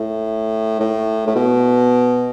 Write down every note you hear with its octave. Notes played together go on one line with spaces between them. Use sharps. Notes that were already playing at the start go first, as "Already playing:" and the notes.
Already playing: A2
A2
A2
B2